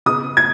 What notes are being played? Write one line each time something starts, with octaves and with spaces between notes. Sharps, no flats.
C#3 B3 D#6
G#6